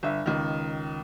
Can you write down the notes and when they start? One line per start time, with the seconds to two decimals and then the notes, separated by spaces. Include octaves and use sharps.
0.03 G1 E5
0.26 C#2 D#3